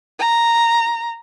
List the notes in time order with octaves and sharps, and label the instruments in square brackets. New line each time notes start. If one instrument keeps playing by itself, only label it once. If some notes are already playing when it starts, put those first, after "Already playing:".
[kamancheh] A#5